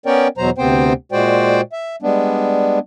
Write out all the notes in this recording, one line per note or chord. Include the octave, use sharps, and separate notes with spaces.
B3 C#4 A#4 C#5 D5 G5
E2 B2 F#3 C5 A#5
D2 C3 B3 C4 C5 G5
A#2 G#3 F#4 C5 D5 G5
E5
G3 G#3 B3 D4